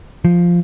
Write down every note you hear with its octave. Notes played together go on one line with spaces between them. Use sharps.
F3